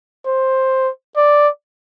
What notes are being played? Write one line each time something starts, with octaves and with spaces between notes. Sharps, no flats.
C5
D5